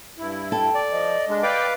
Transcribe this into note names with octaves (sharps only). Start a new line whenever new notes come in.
G2 E4
A4 G5
D5
F3 D#5
G#3 D4
B4 D5 F5 G5 D6